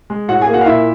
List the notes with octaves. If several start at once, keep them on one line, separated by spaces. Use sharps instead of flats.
G#3
A2 F#4 F#5
G#4 G#5
A#3
F#4 F#5
F5
A#2 E4 E5